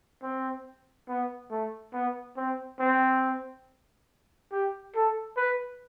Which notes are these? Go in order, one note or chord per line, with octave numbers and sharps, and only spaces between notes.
C4
B3
A3
B3
C4
C4
G4
A4
B4